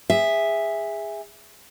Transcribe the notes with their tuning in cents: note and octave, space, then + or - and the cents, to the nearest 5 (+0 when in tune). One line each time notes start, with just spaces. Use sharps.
G#4 -20 E5 +0